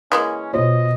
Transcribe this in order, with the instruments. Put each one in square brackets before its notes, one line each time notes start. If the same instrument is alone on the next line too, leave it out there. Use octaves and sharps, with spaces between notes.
[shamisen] E3 G#3 A#3 [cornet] C#4
[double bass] B2 [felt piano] F4 C5 C#5 [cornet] D#5